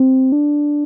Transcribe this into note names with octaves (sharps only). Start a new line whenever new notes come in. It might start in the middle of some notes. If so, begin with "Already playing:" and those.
Already playing: C4
D4